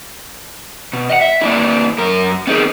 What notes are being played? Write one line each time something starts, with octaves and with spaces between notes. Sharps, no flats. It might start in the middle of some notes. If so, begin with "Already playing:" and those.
B2
D#5 F#5
E5
A#3 D4 E4
F#2 A#4
B3 C4 D#4 F#4 G#4 A#4